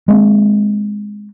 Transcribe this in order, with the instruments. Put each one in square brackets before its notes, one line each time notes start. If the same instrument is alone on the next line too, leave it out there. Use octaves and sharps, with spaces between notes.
[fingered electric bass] G#3 A#3 C4